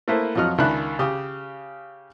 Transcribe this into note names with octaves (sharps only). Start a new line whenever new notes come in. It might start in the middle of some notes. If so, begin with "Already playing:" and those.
A3 A#3 E4 B4 C5
F2 F3 F#3 D#5 F6
C#2 D#3 D4 E5 B5 F#6
C#3 G4 D#6